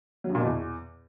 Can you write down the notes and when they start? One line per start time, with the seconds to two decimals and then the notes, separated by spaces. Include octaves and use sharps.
0.24 F#3
0.29 G2
0.35 A#2
0.40 B2
0.45 E2